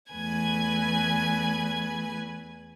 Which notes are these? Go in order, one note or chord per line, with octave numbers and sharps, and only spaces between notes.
E2 A3 B4 G#5 G#6